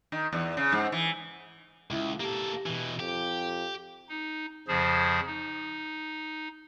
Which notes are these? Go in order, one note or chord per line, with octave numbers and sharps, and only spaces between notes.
D#3
E2
C#3
G#2
E3
C#2 E4
A#3 G4 A4
B2 E3
F2 G4
D#4
F2 C#3 F3 G#4 C5
D#4